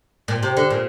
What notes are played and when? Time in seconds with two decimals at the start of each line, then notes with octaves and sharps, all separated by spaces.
0.28 A#2
0.43 C3
0.57 D3
0.70 A#2